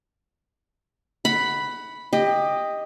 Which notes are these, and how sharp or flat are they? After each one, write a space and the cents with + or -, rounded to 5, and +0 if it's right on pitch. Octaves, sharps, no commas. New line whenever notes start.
F#5 +15 B5 +0
G4 +20 D#5 +0